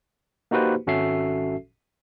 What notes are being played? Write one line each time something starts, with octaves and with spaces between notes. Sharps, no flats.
A#3 D#4 F#4 G4 B4 C5
G#1 C#4 F#4 A4 E5 C7